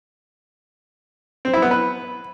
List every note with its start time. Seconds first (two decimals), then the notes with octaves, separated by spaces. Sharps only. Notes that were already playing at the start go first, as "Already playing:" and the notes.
1.45 C4
1.54 E4
1.62 B3
1.71 B4